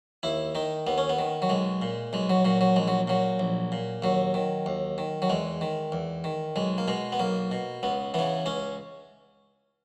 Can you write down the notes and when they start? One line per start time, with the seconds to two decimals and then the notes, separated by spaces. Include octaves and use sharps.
0.23 D#2 E4
0.55 D#3 D#4
0.87 D#2 B3
0.98 C#4
1.09 B3
1.19 D#3
1.42 F#3
1.49 B1 G#3
1.82 A#2
2.13 B1 G#3
2.30 F#3
2.45 A#2 F#3
2.61 F#3
2.76 A#1 G#3
2.88 F#3
3.07 A#2 F#3
3.40 A#1
3.72 A#2
4.02 D#2 F#3
4.34 D#3
4.66 D#2
4.98 D#3
5.22 F#3
5.30 E2 G#3
5.61 D#3
5.92 E2
6.24 D#3
6.56 B1 G#3
6.78 A#3
6.88 B2 G#3
7.12 B3
7.20 B1 A#3
7.51 B2
7.83 C#2 B3
8.14 C#3 E3 B3
8.46 C#2 C#4